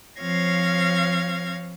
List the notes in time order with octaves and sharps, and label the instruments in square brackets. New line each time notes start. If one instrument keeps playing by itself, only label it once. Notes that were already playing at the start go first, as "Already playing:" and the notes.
[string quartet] F3 C4 C#5 F5 G#6 A#6